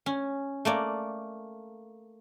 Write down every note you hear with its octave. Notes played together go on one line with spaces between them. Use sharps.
C#4
A3 A#3 D5